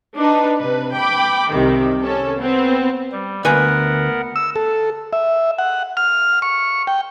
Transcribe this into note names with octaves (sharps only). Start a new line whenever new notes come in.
D4 D#4 B4
C3 B4
G5 B5 D6
C2 C3 D#3
C#4 A4
B3 C4
G3
D2 B3 A#4 B4 F#5 G#5
E6
A4
E5
F#5
F6
C#6
G5